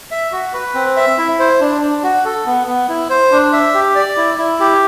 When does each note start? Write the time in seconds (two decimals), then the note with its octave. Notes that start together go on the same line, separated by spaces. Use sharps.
0.11 E5
0.32 F#4
0.54 B4
0.75 C4
0.97 E5
1.18 E4
1.39 C5
1.60 D4
1.82 D4
2.03 F#4
2.25 A4
2.46 B3
2.67 B3
2.89 E4
3.10 C5
3.32 D4
3.53 E5
3.74 G4
3.95 D5
4.17 E4
4.38 E4
4.60 G4